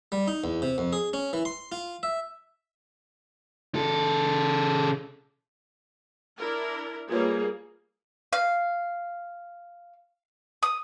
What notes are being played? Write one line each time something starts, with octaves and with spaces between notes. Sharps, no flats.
G3
D#4
E2
C3
F2
G#4
C#4
E3
C6
F4
E5
C#3 A4
D4 E4 A#4
G3 A#3 F4 G#4 B4 C#5
F5
D#6